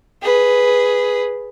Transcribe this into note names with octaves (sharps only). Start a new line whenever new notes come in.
G#4 B4